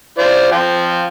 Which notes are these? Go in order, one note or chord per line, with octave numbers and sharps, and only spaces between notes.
F4 C5 D5
F3 F4 G5